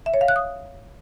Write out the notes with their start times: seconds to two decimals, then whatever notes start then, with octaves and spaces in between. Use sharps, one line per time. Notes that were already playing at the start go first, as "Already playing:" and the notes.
0.06 E5
0.14 C#5
0.21 F5
0.28 F#6
0.36 D#6